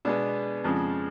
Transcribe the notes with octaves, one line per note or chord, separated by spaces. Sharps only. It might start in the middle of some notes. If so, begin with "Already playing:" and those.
B2 G#3 B3 D4
F2 C#3 F3 G#3